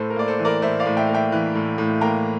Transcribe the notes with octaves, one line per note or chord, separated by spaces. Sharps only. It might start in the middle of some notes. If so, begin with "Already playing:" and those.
Already playing: A2 A4 C5
A#4
A#3 D5
A4 C5
E3
A#4 D5
A2 C5 E5
D5 F5
A2
E5 G5
A#3
E5 G5
E3
A2
A2
A#3 G5 A#5